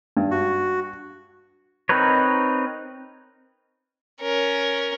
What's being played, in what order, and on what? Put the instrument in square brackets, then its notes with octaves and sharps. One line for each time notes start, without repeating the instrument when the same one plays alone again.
[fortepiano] G2
[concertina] F#4
[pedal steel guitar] C4 D#4 A#4 B4 C#5
[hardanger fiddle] C#4 A#4